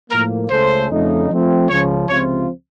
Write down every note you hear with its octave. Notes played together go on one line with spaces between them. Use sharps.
A2 F3 A#3 A#4
C#2 C#3 A3 C#4 A4 C5
F2 C#3 A3 D#4
F3 A3 C4 F4
C#2 C#3 F3 C#5
C#2 C3 F3 C4 F4 C#5